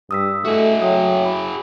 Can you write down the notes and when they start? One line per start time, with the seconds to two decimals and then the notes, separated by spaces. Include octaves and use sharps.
0.11 G2 D#6 E6 B6
0.45 A3 F#4 G#4 D#5 E5
0.82 F#3 E5 G5 D#6
1.26 B5